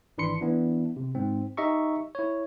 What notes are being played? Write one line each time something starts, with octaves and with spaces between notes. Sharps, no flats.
G#1 E3 D4 B5 C6 C#7
E3 B3 D4 E4
C3
G#2 C4
D#4 G4 D#5 E5 A#5 C#6
E4 C#5